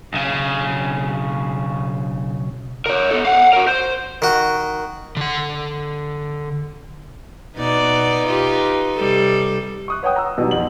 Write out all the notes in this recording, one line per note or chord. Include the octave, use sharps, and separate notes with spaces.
B1 C#3
A#4 C#5
B3 A4
F5 F#5
F#4 A#4
C5
D#3 F#4
D3 F#5
B2 D#4 B4 D5
F4 G4
C3 G3 A4
C#6 D#6 F#6
B4 C#5 F#5 G5 D#6
A#5 E6
B2 F#3 G3 D#4
F2 F#7